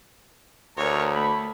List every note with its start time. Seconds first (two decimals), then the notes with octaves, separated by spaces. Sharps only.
0.77 D2 A#4 C#5 A#5
1.16 A3 B5